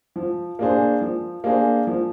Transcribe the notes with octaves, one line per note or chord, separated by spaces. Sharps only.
F3
A#3 D4 G#4 C5
F3
A#3 D4 G#4 C5
F3